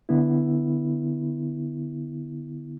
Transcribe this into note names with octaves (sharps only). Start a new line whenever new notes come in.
D3 B3 E4